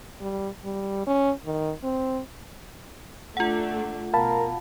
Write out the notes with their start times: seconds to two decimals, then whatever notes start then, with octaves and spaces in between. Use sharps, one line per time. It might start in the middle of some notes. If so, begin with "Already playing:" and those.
0.21 G3
0.64 G3
1.07 C#4
1.45 D#3
1.83 C4
3.37 A3 D4 F4 F#5
4.14 B2 A#4 F5 A5 B5